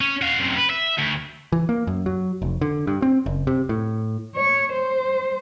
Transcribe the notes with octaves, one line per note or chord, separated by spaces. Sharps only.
C#4
F#4 F5
F#2 C3
B4
E5
D2
E3
A#3
F#2
F#3
F1
D3
G2
C4
F#1
C3
A2
C#5
C5